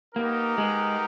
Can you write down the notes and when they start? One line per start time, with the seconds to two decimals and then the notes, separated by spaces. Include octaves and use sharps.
0.15 A#3 B3 D#4 G4 A#4
0.58 G#3